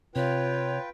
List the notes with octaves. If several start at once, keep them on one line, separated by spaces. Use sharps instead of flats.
C3 F4 B4 C#5 G5